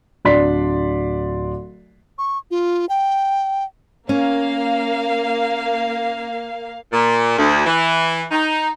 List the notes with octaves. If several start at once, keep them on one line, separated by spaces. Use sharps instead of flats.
D1 D4 D5 C6 B6
C#6
F4
G5
A#3 C#4 F5
A#2
D2
E3
D#4